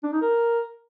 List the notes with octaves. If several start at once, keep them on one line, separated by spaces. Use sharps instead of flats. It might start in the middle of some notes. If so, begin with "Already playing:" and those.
D4
D#4
A#4